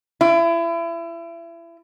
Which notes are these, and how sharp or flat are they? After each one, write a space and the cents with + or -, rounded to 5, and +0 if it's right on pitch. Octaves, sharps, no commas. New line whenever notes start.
E4 +30